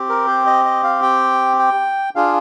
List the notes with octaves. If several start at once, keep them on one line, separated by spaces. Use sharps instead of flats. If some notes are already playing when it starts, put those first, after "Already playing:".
Already playing: C4 G4
A#4
C5
D#5
D#5
F5
G5
G5
D4 F4 G#4 F5